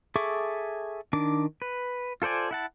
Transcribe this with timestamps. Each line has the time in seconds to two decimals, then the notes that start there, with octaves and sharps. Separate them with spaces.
0.16 G#4 A4 E5 C#6 D6
1.13 D#3 D4 D6
1.62 B4
2.22 F4 A4 C5 D5 G#5
2.51 E4 F#5 A5